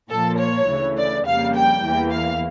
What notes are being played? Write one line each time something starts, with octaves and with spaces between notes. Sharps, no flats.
A#2 F3 A#3 A4
C#5
D2 C#3 E3 A3
D5
F2 C#3 G3 A#3 F5
G5
E2 E3 A#3
F5